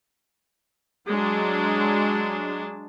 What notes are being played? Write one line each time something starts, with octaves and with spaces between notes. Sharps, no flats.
F#3 G#3 D4